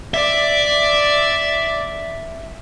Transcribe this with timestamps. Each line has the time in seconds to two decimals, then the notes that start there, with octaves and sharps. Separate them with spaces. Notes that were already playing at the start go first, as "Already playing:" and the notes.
0.14 D5 E5